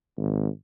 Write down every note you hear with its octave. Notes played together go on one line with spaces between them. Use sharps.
G#1